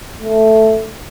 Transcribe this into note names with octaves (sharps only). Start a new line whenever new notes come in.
A3